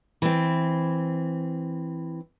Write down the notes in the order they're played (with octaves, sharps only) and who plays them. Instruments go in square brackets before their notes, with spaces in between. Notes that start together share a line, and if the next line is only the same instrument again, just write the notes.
[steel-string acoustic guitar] E3 C4